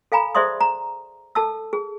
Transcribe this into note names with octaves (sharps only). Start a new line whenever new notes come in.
A4 F5 G#5 A#5 B5
G#4 C5 D5 E5 C6 D#6
A#5
A4 A5 E6
G#4